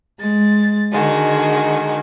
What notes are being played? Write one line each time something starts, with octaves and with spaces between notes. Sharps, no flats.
G#3 A6
D3 D#3 G#3 F#4